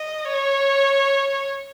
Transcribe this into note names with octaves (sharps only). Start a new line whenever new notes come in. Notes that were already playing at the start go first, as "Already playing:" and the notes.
Already playing: D#5
C#5